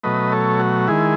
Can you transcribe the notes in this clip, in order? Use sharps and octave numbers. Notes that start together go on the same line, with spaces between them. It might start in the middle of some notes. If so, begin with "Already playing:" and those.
B2 F#3 A3 B4 D#5
A4 C#5
F#4
D#3 G#3 E4 G#4